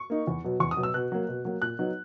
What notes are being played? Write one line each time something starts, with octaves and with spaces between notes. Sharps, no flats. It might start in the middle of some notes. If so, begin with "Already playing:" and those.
Already playing: C#6
A#3 D#4
E2
B2 F#3
E2 C#6
D#6
B2 F#3
E6
B2 F#6
F#3 A#3
B2
F#3 A#3
A#2 F#6
F#3 B3 D#4